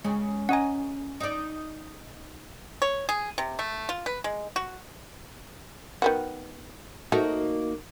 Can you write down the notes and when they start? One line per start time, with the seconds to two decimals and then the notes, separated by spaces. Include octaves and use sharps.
0.04 C#3 G#3
0.49 C#4 D#5 F#5 G#5 A#5
1.20 D#4 D5
2.82 C#5
3.09 G#4
3.38 C3
3.59 A3
3.89 F4
4.06 B4
4.24 G#3
4.56 F#4
6.02 D#3 B3 F#4
7.12 A3 A#3 D#4 F#4